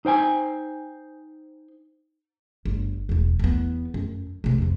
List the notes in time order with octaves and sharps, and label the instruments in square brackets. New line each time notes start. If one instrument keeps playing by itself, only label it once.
[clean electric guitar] D#4 C5 G5 G#5
[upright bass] G1
E1 E2
E2 B3
F#2
E1 C3
F2 E3